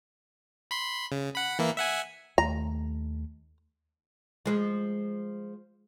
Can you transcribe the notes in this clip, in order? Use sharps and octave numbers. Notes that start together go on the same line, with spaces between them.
B5 C6
C#3
F#5 B5
E3 A#3 E4
E5 F#5 G#5
D#2 A3 A#5
F3 G#3